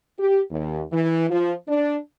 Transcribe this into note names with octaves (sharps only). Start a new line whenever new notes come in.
G4
D#2
E3
F3
D4